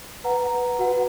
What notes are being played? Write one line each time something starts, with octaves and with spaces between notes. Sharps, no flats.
B4 F#5 A#5
F#4 B4 F#5